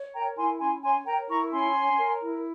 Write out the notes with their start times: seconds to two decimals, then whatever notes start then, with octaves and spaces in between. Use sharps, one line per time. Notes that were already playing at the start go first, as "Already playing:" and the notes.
Already playing: C#5
0.14 A#4 G5 A#5
0.37 E4 G#5 C6
0.60 C#4 G#5 C6
0.83 C#5 G#5 C6
1.06 A#4 G5 A#5
1.29 E4 A#5 C#6
1.52 C#4 G#5 C6
1.75 C#5
1.98 A#4
2.22 E4